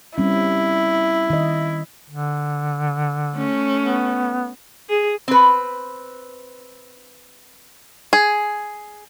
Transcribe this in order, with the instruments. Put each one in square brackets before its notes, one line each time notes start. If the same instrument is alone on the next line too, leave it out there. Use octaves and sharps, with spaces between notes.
[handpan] G3 C4 C#4 [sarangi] E4
[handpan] D#3 D#5
[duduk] D3
[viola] A3 C#4
[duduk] B3
[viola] G#4
[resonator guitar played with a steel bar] C4 B4
[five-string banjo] G#4